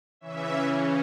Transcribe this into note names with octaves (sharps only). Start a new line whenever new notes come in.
C#3 E3 C#4 E5